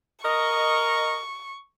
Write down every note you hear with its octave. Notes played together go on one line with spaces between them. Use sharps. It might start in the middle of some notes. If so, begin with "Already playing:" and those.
A#4 D#5 C#6